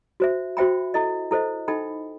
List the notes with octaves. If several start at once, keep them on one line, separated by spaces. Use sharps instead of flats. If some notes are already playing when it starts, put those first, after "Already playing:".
F#4 C5 E5
F#4 C5 E5 G5 B5
E4 A4 D#5
E4 A4 C5 D#5
D#4 A4 D#5 G5 B5